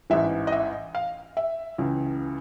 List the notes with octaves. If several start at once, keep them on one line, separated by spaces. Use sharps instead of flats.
A1 G#2 E3 E5
D#5
E5
F5
E5
C#2 C#3 E3